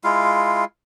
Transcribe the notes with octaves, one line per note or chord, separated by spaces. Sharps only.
G#3 E4 F4 F5